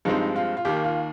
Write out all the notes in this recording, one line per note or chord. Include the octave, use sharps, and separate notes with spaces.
G2 F3 G#3 C4 D#4
F4
F4
D#2 D#3 A#3 G4
F4